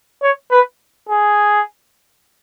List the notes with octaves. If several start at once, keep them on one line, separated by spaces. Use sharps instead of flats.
C#5
B4
G#4